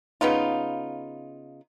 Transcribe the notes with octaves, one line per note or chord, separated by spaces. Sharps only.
C#3 B3 D#4 F4